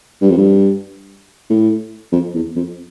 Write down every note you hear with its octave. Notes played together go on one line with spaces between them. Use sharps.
G2
F2
G2
A2
F2
E2
F2